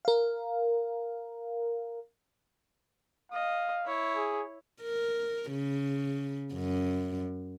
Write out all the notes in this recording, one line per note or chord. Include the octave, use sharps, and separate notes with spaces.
A#4 F5
D#5 F5
E4 C#5
G#4
A#4
C#3
F#2